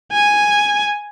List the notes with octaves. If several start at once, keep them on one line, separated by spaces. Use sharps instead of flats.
G#5